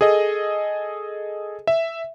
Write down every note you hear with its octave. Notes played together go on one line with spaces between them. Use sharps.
G#4 A4 D#5
E5